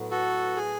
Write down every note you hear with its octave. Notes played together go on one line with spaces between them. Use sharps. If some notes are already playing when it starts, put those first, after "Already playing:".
Already playing: A2 F#3 B3
F#4 A4
G#4